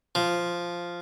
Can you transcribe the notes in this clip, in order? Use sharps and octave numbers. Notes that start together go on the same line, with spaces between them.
F3